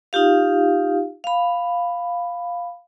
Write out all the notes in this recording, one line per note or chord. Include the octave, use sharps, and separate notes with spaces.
D#4 F4 G4 F5
F5 B5